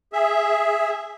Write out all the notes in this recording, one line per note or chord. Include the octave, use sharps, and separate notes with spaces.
G#4 E5